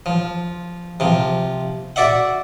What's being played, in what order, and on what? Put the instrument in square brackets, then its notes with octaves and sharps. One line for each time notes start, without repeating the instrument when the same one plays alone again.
[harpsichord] F3
C3 F3
F#4 D5 E5 F#5